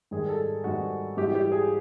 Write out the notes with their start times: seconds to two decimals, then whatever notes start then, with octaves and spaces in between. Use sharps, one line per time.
0.11 G#2 D#3 G3 G#4
0.29 A4
0.64 G#2 D#3 G3 F#4
1.17 G#2 E3 G3 G4
1.35 G4
1.52 G#4